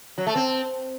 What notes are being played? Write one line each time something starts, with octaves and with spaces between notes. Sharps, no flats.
F#3
A3
C4